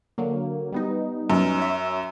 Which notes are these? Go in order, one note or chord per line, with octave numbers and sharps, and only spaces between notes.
D3 F#3 A#3
G3 B3 D#4
F#2
C#5 E5